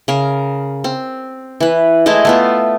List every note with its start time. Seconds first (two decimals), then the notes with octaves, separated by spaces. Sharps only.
0.08 C#3 A#4
0.84 C4
1.60 E3 B4
2.06 G#3 A3 E4 D#5
2.25 A3 B3 F4